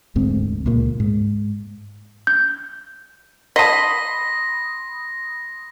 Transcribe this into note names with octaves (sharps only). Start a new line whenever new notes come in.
E1 D2 G#2 C4
C#2 A#2 A#3
G#2
G6
D#5 A5 B5 C6 D#6 A#6